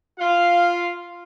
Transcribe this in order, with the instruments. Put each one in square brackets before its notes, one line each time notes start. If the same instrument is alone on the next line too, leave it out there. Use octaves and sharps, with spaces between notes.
[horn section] F4 F5